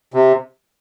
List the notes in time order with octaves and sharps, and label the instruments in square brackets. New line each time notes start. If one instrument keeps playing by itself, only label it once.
[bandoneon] C3